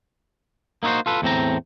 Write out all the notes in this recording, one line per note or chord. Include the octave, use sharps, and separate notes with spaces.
A#3 D#4 E4 F#4 C5
F4 A4 B4
E2 A2 C4 A#5